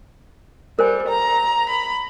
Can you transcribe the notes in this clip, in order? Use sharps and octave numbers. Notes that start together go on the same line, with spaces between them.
G3 A#4 C5 G#5
A#5
B5